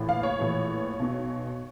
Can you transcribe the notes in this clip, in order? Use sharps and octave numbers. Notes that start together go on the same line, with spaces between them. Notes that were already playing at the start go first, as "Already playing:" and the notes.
Already playing: A#1 A2 E3
F5
C#5
A#1 A2 E3
B1 B2